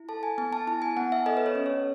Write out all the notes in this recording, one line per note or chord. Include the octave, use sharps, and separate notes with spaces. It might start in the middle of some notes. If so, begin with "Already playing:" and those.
Already playing: E4
A4 A5
G#5
B3 G#5
A5
E4 A5
G#5
B3 F#5
E5
A4 D#5
B4
C#5
C#4
C#5